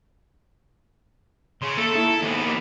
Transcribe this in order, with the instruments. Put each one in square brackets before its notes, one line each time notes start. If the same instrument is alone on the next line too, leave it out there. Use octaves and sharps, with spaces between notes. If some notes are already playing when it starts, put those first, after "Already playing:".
[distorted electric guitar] C#3 [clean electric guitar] C#5 C6
[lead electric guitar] A3 [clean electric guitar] A#3 [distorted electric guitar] A4
[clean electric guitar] A#3 D#4 [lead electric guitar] E4
[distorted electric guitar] D#2 B3 [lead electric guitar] G#2
[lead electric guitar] A#3 G4